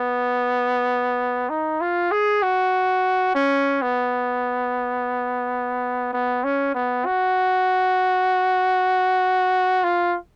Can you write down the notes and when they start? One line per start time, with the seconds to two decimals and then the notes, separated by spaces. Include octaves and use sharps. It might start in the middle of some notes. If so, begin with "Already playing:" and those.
Already playing: B3
1.50 D#4
1.81 F4
2.11 G#4
2.42 F#4
3.35 C#4
3.82 B3
6.13 B3
6.44 C#4
6.75 B3
7.06 F#4
9.84 F4